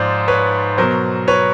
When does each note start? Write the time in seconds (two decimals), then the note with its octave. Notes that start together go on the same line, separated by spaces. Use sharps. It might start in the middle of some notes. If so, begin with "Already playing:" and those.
Already playing: G#2 F3 C5 D5
0.28 B4 C#5
0.78 B2 F#3 A#4 C5
1.28 B4 C#5